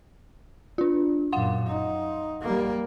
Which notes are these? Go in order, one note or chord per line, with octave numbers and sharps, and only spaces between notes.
D4 F4
F#2 A#2 F5 F#5 C6
D#4
G3 A#3